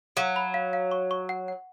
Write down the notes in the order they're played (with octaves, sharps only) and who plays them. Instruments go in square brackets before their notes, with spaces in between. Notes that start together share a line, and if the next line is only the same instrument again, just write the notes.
[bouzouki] F#3 [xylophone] F5
[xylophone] B5
F5
F5
C#6
C#6
F#5
F#5